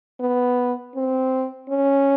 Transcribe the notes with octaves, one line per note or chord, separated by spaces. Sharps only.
B3
C4
C#4